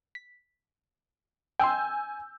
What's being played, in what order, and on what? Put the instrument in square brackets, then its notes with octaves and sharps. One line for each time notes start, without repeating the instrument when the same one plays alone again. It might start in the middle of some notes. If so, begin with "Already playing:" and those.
[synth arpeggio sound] B6
[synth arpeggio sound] G5 C6 [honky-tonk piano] G#5 E6 G6